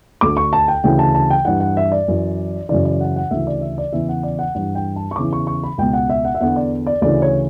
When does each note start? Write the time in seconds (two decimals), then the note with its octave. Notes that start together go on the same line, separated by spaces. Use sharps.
0.21 D2 D3 D6
0.37 C#6
0.53 A5
0.68 G5
0.84 D2 C#3 E3 G5
0.99 A5
1.15 A5
1.30 G5
1.45 G2 E3 F#5
1.60 F#5
1.77 E5
1.92 D5
2.08 F#2 E3
2.69 F#2 C#3 E3 D5
2.85 D5
3.00 F#5
3.16 F#5
3.31 D2 C#3 E3 E5
3.47 D5
3.61 E5
3.78 D5
3.93 E2 C#3 E3 E5
4.09 F#5
4.23 D5
4.39 F#5
4.55 G2 E3 F#5
4.75 G5
4.96 A5
5.11 C#6
5.16 E2 C#3 E3 D6
5.33 C#6
5.47 C#6
5.64 B5
5.78 C#2 B2 G5
5.93 F#5
6.10 E5
6.25 F#5
6.35 E5
6.41 E2 D3 F#5
6.56 D5
6.87 D5
7.01 D2 C#3 E3 D5
7.22 C#5